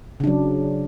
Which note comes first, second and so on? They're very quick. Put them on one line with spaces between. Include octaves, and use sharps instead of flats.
C#3 D4 F#3